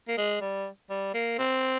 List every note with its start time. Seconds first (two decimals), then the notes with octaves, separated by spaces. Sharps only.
0.08 A#3
0.17 G#3
0.41 G3
0.90 G3
1.14 A#3
1.39 C4